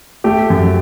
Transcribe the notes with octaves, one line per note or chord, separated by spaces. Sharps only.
A3 G4
F#2